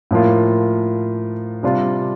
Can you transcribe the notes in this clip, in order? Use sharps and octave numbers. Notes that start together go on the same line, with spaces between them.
A2 F3 A#3 F4
C3 G3 D4 F4